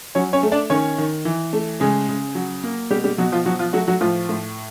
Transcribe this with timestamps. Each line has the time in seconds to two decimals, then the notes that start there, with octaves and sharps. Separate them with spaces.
0.15 F#3 C#4 C#5
0.33 C#4 C#5
0.43 A3
0.52 D4 D5
0.70 D#3 C#4 C#5
0.98 D#3
1.25 E3
1.53 A3
1.80 C#3 G#3 G#4
2.09 C#3
2.35 F#3
2.64 A#3
2.91 B2 G3 G4
3.04 G3 G4
3.18 B2 F#3 F#4
3.32 F3 F4
3.46 F3 F#3 F#4
3.59 F3 F4
3.73 F#3 A3 F#4
3.87 F#3 F#4
4.01 A2 F3 F4
4.29 A2